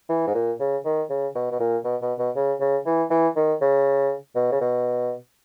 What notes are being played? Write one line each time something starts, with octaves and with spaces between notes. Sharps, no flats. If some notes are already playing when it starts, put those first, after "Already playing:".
E3
G#2
A#2
C#3
D#3
C#3
B2
B2
A#2
B2
B2
B2
C#3
C#3
E3
E3
D#3
C#3
B2
C#3
B2